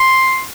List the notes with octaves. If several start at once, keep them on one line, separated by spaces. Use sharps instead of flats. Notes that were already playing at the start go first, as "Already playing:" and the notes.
Already playing: C6